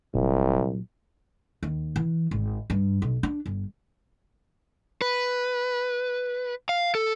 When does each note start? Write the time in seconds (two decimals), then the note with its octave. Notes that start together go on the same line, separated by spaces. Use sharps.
0.14 F1 C2 A#2 F#3
1.63 D#2
1.96 E3
2.31 G#1
2.70 G2
3.02 B1
3.23 D4
3.46 G1
5.01 B4
6.69 F5
6.95 A4